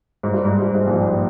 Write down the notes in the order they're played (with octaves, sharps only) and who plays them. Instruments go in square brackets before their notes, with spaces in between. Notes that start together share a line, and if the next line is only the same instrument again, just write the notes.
[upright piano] G#2
G2
G#2
G2
G#2
A#1 A#2